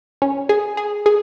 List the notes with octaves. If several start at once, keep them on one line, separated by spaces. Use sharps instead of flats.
C#4
G#4
G#4
G#4